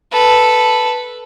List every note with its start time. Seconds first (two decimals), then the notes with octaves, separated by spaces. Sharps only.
0.12 A4 B4